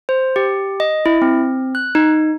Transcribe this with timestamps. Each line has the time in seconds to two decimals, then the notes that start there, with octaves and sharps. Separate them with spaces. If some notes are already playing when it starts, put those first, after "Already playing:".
0.09 C5
0.36 G4
0.80 D#5
1.06 E4
1.22 C4
1.75 F#6
1.95 D#4